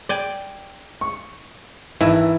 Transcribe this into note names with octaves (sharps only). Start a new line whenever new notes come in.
D5 G5 G#5
C#6
G#1 E3 E4